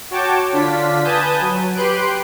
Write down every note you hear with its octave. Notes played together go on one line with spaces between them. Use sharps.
F#4 C#5 G5 A5 D6
D3 D4 F4 B6
B4 G#5 A5 D#6 G6
F#3
G4 B4 C6 F#6 D7